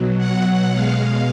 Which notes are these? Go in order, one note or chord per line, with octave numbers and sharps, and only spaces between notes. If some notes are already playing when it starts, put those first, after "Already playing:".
Already playing: B2 F#3
F#5
B2 G#3 F5